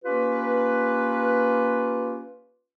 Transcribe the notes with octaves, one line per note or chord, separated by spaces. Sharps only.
A#3 C#4 F4 G4 B4